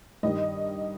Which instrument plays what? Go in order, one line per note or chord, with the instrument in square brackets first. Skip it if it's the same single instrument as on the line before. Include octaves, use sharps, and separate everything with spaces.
[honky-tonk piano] G2 D#3 G3 D#5